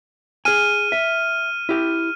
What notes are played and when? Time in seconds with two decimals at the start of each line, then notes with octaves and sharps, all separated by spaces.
0.45 G#4 G#5 F6 D#7
0.92 E5
1.69 E4 G4